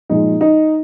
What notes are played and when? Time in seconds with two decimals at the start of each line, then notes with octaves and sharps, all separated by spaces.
0.10 A#2 F3 G#3 D#4
0.41 D#4